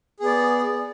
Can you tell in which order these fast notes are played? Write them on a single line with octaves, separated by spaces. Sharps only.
G#4 B3 D5